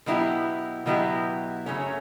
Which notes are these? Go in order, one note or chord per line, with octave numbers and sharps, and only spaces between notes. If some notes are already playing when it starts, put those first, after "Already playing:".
B2 F#3 B3 E4 G4
B2 F#3 B3 E4 G4
F#2 C#3 F#3 A3 C#4